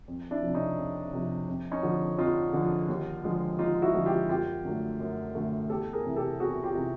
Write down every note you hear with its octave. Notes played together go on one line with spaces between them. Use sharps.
F2
D4 E4
C3 F3
C#4 D#4
F2
C3 F3
F2
C#4 D#4
D3 F3
F2 D#4 F4
D3 F3
D#2
D3 F3 G#3
D#2 D#4 F4
E4 F#4
D3 F3 G#3
F4 G4
F#2 F4 G4
D3 F#3 A3
F#2
D3 F#3 A3
E2 G4 A4
G#4 A#4
C3 E3
G4 A4
E2 F#4 G#4
F4 G4
C3 E3